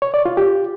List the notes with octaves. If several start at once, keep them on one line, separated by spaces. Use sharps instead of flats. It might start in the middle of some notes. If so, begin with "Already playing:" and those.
C#5
D5
F4
G4